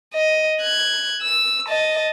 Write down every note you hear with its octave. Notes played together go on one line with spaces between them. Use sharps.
D#5
F#6 G#6
E6
D#5 A5